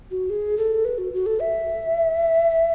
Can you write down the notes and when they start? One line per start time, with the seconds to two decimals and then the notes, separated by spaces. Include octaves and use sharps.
0.11 F#4
0.30 G#4
0.58 A4
0.85 B4
0.98 F#4
1.13 F#4
1.26 A4
1.40 E5